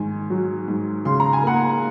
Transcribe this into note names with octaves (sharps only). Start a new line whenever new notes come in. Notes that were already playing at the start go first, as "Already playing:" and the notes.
Already playing: G#2 D#3 G#5
F#3
G#2
C#3 C6
A#5
G#5
A#3 F#5 A#5